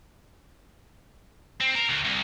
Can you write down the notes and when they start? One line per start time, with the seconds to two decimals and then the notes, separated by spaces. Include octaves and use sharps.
1.61 C4
1.75 A#4
1.89 D2
2.04 C2